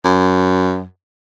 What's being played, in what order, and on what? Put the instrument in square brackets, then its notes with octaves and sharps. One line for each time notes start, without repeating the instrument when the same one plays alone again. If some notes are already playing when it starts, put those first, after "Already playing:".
[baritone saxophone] F#2